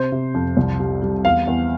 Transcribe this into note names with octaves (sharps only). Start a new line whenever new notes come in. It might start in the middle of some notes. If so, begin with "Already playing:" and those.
Already playing: C3 C5
C3
F2
C2
G3
G3
E2 F5
E2